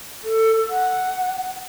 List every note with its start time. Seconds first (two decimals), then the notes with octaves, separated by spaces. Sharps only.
0.24 A4
0.69 F#5